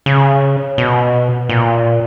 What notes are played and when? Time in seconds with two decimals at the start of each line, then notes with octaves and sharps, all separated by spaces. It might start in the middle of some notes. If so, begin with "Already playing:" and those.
0.06 C#3
0.78 B2
1.49 A#2